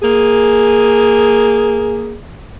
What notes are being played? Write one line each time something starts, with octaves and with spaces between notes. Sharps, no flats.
A#3 G#4